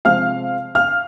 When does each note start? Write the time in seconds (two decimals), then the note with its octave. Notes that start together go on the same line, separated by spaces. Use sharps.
0.05 C3 F3 G#3 F5 F6
0.75 F5 F6